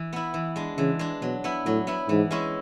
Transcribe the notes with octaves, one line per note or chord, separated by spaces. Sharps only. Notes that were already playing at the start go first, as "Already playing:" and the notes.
Already playing: E3
B3 E4
E3
G#3 D4
C#3 E3
G#3 D4
B2 F#3
B3 E4
A2 F#3
B3 E4
G#2 E3
G#3 C#4 E4